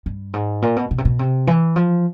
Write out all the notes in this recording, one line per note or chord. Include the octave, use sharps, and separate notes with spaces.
G2
G#2
A#2
B2
B2
C3
B2
C3
E3
F3